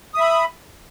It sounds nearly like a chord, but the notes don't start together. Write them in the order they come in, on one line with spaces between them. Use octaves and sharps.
D#6 E5 B5